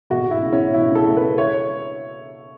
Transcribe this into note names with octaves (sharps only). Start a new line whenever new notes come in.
B2 F#4
B2 E4
C#2
C#4
B2
B2 E4
C#2
A4
C#2
C#2 B4
C#5